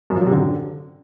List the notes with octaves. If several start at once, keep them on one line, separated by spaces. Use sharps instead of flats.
F#2
F3
F#3
C3
D3